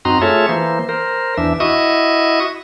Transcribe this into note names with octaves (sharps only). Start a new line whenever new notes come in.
F#2 C4 D#4 F#4 A#5 C6
A3 F4 G#4 A4 C#5 E5
E3 A#3 C5
A#4 C5
E2 E3 D4 E5
E4 F#4 D#5 E5 C#6 D#6